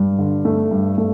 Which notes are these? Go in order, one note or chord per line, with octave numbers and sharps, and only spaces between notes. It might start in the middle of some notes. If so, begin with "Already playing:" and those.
Already playing: G2
D3
A3
G2
A3